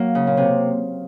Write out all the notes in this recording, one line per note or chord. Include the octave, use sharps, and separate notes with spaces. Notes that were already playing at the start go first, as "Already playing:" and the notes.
Already playing: F#3 A#3
C#3
A#2
C3